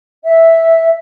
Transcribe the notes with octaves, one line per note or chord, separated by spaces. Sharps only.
E5